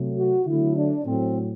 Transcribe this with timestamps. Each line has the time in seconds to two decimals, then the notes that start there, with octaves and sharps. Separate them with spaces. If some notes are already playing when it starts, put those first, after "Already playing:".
Already playing: C3 F#3 A3
0.17 F#4
0.47 D3 F#3 A3 E4
0.76 D4
1.05 A2 F#3 A3 C4